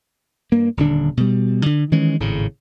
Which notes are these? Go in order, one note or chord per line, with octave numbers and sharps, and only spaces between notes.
G2 A#3
D#1 D3 D4
B2 G3
D3
D#3 E3 G#3 C#4
G#1 A2 C#3